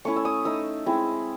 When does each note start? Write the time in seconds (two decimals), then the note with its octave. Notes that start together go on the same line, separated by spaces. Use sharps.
0.05 A3 C#4 E4 C#6
0.16 E6
0.25 D#6
0.45 A3 D#4 E6
0.86 G#3 C4 E4